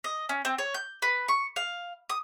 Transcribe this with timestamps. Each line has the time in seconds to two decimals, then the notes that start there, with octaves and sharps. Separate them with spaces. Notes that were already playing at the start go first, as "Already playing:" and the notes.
0.04 D#5
0.29 C#4
0.45 C4
0.58 C#5
0.74 G6
1.02 B4
1.28 C#6
1.56 F5
2.09 D#6